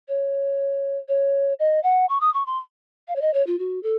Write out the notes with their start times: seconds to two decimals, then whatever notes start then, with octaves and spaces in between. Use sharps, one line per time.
0.08 C#5
1.09 C#5
1.59 D#5
1.83 F#5
2.09 C#6
2.21 D#6
2.34 C#6
2.47 C6
3.08 F5
3.16 C#5
3.21 D#5
3.34 C#5
3.47 F4
3.59 F#4
3.83 A4